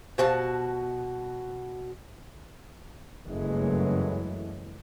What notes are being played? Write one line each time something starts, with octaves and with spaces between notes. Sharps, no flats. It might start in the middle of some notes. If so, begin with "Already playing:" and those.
B2 F#4 G4 C5 F5 A5
F#1 G2 E3 F#3 G#3 A3